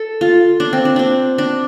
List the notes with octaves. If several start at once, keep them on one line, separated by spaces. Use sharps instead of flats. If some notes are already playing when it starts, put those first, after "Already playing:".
Already playing: A4
F4
D4
C4
D4
C4 D4
D4